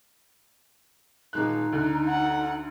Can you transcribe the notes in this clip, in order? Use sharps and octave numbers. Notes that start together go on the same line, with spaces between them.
D#1 G#3 D#4 F#6
D2 D3 F#6
F#5